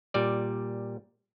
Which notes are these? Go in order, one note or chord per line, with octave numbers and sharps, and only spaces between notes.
A#2 G3 D5